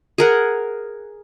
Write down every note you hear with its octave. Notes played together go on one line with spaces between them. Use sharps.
G#4 A#4 F#5